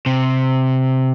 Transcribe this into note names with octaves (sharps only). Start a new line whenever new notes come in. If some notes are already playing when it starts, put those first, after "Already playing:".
C3